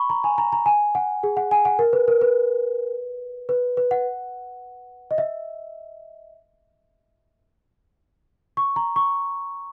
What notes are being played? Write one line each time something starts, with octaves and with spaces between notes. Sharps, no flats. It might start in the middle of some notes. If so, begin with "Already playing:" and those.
Already playing: B5 C#6
A#5
G#5
A#5
A#5
G#5
F#5
G#4
F#5
G#5
F#5
A#4
B4
A#4
B4
B4
B4
F#5
D#5
E5
C#6
A#5
C#6